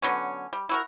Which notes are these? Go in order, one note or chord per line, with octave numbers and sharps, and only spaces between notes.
D3 F#3 B3 C#4
G3
E4 F#4 A#4